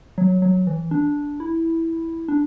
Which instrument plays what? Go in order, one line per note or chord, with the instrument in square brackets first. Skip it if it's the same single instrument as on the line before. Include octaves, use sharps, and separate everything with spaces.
[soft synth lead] F#3
F#3
E3
D4
E4
D4